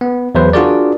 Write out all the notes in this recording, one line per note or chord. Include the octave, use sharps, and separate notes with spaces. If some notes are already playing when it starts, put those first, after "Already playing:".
B3
E2 F#3 B4 C5
D4 F4 F#4 G#4 A#4 D5